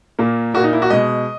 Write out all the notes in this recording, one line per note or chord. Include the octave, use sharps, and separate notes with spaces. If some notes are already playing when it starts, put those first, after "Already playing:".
A#2 A#3
A#2 A#3 F#4
D#4
E4
F#4
B2 G#3 D#5